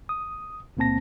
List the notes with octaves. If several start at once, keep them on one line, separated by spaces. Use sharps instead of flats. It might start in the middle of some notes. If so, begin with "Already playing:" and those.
D#6
C#2 A#2 A#3 C4 A5 A#6